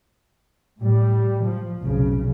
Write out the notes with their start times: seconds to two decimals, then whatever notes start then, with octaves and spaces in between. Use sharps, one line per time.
0.79 A2 G3
1.44 F3
1.79 F1 B1 C#3